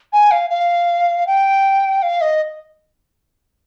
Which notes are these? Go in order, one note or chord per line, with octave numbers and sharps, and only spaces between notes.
G#5
F5
F5
G5
F5
D#5